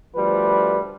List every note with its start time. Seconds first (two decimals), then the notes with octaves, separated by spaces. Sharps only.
0.15 D2 F3 G3 B4